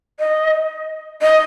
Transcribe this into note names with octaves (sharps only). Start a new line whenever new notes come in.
D#5
D#5